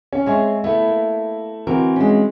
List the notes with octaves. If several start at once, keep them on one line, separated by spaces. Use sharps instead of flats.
C#4
G#3 C4 C#5 E5 G#5
A3 B3 E4
A#3
E3 C4 F#4 A#4
G#3 C#4